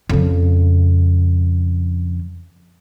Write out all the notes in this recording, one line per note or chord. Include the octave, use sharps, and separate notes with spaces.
F2 C#3